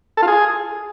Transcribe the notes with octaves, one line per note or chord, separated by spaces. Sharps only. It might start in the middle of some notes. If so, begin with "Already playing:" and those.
A4
F4
G#4